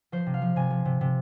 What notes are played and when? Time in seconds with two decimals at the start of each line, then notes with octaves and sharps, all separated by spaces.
0.12 F3 C5
0.26 C3
0.34 F5
0.42 F3
0.56 C3 G#5
0.70 F3
0.85 C3
1.01 C3